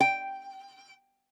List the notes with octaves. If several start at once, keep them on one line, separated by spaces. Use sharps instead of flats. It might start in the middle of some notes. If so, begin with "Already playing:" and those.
G5